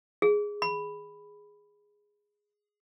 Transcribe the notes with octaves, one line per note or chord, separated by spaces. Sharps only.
G#4
B5